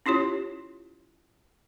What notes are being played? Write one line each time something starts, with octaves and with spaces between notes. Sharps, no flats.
C#4 E4 F4 G4 C#5